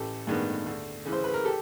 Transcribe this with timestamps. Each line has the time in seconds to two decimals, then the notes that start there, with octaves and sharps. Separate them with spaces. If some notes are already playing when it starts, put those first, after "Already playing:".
Already playing: A1 G4 A4
0.27 G2 D#3 G#3 B3
0.66 D2
1.05 C#3 E3
1.13 C5
1.24 B4
1.34 A#4
1.45 G4 A4